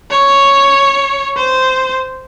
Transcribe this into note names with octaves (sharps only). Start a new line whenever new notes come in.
C#5
C5